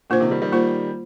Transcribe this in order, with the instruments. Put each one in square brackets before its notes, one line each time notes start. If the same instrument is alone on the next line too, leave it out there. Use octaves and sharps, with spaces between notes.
[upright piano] A#2 D3 [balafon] A#3 F4 C5
[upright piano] C3 D#3
D#3 G3
D#3 G3
[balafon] A#3 F4 C5